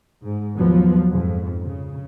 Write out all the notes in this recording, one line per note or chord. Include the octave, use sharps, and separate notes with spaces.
G#2
D#2 F3 F#3 B3
F2 G#2
C#3